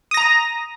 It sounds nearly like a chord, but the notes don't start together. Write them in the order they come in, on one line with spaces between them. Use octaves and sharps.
D#6 A#6 A#5